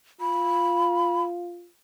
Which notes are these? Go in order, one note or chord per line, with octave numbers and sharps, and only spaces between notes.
F4 B5